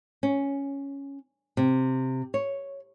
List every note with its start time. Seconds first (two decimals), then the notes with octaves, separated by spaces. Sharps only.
0.23 C#4
1.57 C3
2.34 C#5